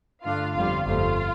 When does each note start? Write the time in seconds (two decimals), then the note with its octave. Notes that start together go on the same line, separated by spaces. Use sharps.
0.24 G2 D3 A3 D4 F4 F5
0.55 G1 F2 D3 G3 F4 F5
0.86 G1 F2 F3 A3 F4 F5